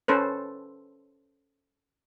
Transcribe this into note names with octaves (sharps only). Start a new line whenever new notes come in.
C#4 A4 B4 C5